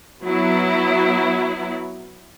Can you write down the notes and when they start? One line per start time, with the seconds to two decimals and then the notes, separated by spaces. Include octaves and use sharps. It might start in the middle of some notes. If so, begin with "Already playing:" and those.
0.23 F#3 B3 E4